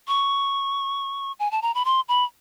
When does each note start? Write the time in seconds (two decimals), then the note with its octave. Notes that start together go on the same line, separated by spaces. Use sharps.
0.08 C#6
1.39 G#5
1.51 A5
1.62 A#5
1.75 B5
1.85 C6
2.08 B5